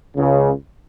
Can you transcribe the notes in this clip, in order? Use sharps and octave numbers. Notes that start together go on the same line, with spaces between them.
C#2 C#3